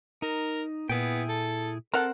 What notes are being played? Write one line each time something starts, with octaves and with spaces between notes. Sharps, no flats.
D#4 A#4
A#2 B3 E4 G#4 G5
A4
C4 A4 A#4 F#5